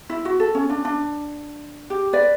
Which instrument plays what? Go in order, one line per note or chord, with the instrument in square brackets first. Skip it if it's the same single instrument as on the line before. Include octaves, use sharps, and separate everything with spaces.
[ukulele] E4
F#4
A4
C#4
D4
D4
G4
B4 D5